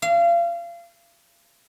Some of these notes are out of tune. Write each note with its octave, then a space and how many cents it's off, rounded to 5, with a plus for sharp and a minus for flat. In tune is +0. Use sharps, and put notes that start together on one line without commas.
F5 -30